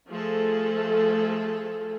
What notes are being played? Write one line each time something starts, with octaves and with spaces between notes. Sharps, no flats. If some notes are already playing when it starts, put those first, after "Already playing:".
F3 A3 G#4 A4